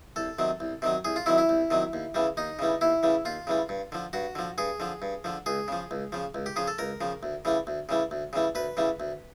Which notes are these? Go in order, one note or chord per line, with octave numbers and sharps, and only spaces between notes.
C2 A4
C3 D#3 F#3
C2
C3 D#3 F#3
C2 G#4
F4
C3 D#3 F#3 E4
E4
C2
C3 D#3 F#3
D#2
C#3 E3 G3
D#2 D#4
C#3 E3 G3
D#2 E4
C#3 E3 G3
D#2 F4
C#3 E3 G3
G2
D3 F3
G2 F#4
D3 F3
G2 G#4
D3 F3
G2
D3 F3
C#2 G#4
C#3 F3
C#2
C#3 F3
C#2
G4
C#3 F3 G#4
A4
C#2 A#4
C#3 F3
D2
C#3 E3 G3
D2
C#3 E3 G3
D2
C#3 E3 G3
D2 B4
C#3 E3 G3
D2